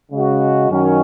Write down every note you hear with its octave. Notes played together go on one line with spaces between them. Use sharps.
C#3 G#3 F#4
F#2 D#3 F#3 C#4